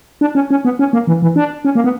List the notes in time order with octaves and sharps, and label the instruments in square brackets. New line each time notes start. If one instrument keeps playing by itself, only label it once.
[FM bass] D4
C#4
C#4
B3
C#4
A#3
E3
E3
D4
C#4
A#3
B3